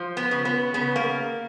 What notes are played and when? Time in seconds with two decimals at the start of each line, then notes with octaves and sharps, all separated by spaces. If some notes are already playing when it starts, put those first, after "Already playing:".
Already playing: F3
0.17 B3
0.31 C#3
0.45 B3
0.74 C#3 B3
0.96 A#3